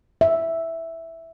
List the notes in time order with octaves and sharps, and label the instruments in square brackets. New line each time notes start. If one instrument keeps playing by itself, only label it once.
[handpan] E5